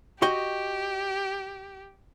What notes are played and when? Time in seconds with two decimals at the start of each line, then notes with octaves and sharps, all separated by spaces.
0.22 F#4 G4 D#5 G5